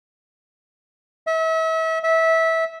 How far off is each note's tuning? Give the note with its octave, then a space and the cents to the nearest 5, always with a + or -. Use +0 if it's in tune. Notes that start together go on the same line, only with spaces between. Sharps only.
E5 -35
E5 -20